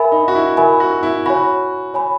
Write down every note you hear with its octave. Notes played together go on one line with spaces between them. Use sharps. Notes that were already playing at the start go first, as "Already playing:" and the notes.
Already playing: A#4 E5 G#5 B5
D#4
F#4
E4
A#4 E5 G#5 B5
F#4
E4
F#4 C#5 G#5 B5
C#5 G#5 B5